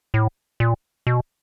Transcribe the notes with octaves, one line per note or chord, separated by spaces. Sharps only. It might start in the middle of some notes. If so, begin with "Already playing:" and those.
A2
A#2
B2